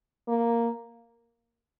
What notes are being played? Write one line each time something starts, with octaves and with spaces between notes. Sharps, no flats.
A#3